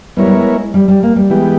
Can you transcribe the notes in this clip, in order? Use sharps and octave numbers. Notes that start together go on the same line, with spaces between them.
G3 B3 E4 A#4 C#5
G3
G#3
G3
G3
A#3
G3
E3 G#3 B3 G4